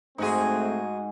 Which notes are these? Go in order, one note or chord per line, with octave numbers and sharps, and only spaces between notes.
G#2 G#3 A3 C4 D#4 F#4 G#4